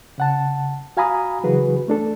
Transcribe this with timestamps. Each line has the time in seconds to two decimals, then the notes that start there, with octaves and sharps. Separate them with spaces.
0.18 C#3 F#5 A5
0.97 F#4 F5 G#5 A#5 B5 D#6
1.44 C#3 E3 F#3 F#4 G#4 B4
1.88 A3 D4 A4